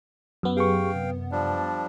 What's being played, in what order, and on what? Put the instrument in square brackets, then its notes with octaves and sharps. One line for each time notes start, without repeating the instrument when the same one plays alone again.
[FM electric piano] F#2 B3
[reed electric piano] G4 G#4 C#6 [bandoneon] F5 G5
[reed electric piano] C3
[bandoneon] F3 G3 D4